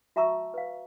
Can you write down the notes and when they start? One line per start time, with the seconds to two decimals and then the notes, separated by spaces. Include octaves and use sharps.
0.16 F#4 E5 A5 A#5 C#6 E6
0.54 B4 F5